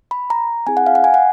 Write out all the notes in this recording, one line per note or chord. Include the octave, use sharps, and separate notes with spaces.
B5
A#5
C4 E4 G#4 G#5
F#5
F5
F#5
G#5
F#5